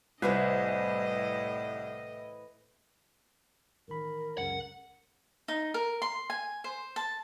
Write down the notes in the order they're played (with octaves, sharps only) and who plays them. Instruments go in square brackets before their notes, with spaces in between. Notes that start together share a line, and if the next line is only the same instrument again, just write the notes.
[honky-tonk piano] C2 [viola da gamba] A2 D#5 [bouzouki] E3 C5 G#5 [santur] B4
[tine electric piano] A1 D#3 B5 [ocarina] A#4
[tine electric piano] C#2 F#2 C#3 [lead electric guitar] F#5
[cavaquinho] D#4
A#4
C6
G#5
C5
A5